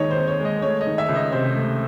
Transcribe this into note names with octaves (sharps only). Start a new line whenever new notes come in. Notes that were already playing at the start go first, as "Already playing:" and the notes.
Already playing: D#2 D#3 G#3 C#5 D#5
C5
C4
C#5
G#3
D#5
A3 C#5
D#5
D#3
E5
C#2
D#5
C3 C5
A3